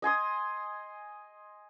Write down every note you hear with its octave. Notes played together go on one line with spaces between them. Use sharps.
D#5 G#5 C6 D#6